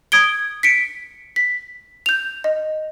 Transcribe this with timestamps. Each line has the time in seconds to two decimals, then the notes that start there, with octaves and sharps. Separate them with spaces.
0.12 D#6 G#6 D7 G7
0.63 B6 C#7 D7
1.36 B6
2.06 G6 F7
2.44 D#5